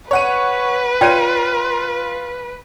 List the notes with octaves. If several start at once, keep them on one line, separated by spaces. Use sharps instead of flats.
B4 C#5 F#5 D#7
F4 C#5 D5 G5 D#7